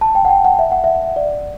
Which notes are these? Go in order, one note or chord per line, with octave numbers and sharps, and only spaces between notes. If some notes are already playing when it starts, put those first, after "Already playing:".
A5
G5
F#5
G5
F#5
E5
F#5
E5
D5